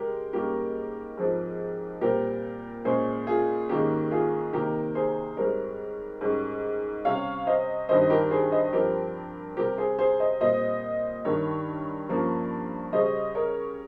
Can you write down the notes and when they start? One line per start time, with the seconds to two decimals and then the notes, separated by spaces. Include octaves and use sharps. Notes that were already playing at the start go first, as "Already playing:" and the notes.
Already playing: C#3 G#3 G4 A#4
0.33 G#2 G3 A#3 C#4 G4 A#4
1.17 G#2 F3 C4
2.01 A#2 G3 C4 G4 A#4
2.85 A#2 G#3 C#4 G#4 C5
3.27 F4 G#4
3.69 G#2 D#3 A#3 C#4 G4
4.11 F4 G#4
4.53 C3 D#3 A#3 G4 A#4
4.95 G#4 C5
5.37 G#2 G3 C4 A#4 C#5
6.21 G#2 G3 C#4
7.05 C3 G3 C#4 C#5 F5
7.47 C5 D#5
7.88 G2 D#3 G3 C4 C5 D#5
8.10 G4 A#4
8.31 G#4 C5
8.52 C5 D#5
8.73 G2 F3 C4 G4 A#4
9.57 C3 G3 C4 G4 A#4
9.78 G#4 C5
9.99 G#4 C5
10.20 C5 D#5
10.41 A#2 G3 C4 C5 D#5
11.25 G2 D#3 G3 A#4 C#5
12.09 G2 F3 A#3 C#4
12.93 C#3 G3 C#4 C5 D#5
13.35 A#4 C#5